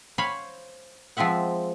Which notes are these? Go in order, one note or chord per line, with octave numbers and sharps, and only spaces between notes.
C5 C#5 F5 G#5 B5
F3 G#3 C4 E5 F#5